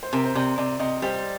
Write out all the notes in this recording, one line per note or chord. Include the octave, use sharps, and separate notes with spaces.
C5
C3 A#4
C5
C3 D5
C3 D5
C3 D#5
G3 C5